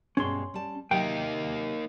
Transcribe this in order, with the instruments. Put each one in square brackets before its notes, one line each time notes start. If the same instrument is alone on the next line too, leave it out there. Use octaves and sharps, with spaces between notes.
[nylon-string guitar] G2 B2 G#3 [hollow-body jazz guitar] C#4 C6
[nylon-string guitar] G3 A5
[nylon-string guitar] C3 F#3 G4 [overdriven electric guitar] A#3 D#4 [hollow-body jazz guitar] G5